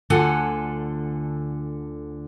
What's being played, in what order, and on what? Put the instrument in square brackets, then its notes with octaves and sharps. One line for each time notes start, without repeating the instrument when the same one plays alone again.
[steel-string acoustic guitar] D2 D3 F4 A4 F#5 G#5